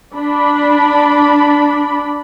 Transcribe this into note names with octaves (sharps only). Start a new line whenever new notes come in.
D4 B5